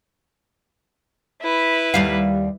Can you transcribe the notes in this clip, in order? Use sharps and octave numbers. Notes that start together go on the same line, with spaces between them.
E4 B4
D#2 G3 F5